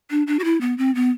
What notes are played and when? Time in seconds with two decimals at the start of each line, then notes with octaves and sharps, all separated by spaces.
0.11 D4
0.27 D4
0.39 F#4
0.44 E4
0.61 B3
0.78 C4
0.95 B3